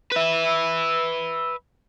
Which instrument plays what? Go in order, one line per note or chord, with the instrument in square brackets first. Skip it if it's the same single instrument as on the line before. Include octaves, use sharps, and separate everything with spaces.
[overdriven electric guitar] B4 E5